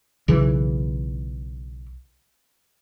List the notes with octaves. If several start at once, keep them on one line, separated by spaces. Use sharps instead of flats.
B1 C#3 E3